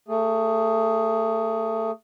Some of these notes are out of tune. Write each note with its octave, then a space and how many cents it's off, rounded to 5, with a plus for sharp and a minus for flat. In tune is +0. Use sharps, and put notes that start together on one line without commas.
A3 +25 G#4 +0